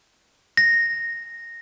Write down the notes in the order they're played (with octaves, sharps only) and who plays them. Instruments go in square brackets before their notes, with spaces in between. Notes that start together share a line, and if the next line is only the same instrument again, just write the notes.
[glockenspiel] A#6